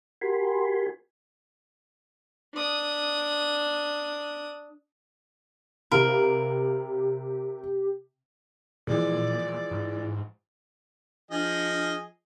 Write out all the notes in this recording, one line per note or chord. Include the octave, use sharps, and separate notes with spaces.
F#4 G4 A#4 G#5 B5 C6
D4 D#6
C3 G4 A#4 F5 B5
A#2 E3 F3 G#3 D5
G#2
F3 D4 G#4 D#5